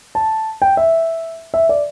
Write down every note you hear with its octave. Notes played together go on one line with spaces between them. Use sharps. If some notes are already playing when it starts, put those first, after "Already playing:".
A5
G5
E5
E5
D5